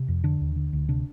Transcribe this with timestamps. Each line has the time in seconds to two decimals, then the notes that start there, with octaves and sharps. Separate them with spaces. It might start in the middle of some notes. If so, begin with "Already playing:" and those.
Already playing: C3
0.08 F2
0.24 D3 D4
0.41 D#2
0.56 D3
0.73 D2
0.89 C3 D4